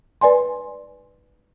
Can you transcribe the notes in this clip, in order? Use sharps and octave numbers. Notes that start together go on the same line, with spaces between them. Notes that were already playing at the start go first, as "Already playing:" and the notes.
B4 D5 G#5 C6